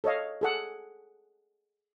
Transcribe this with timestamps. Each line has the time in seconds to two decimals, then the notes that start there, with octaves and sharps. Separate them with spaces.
0.04 A4 C#5 D#5 F5
0.41 G#4 A4 F#5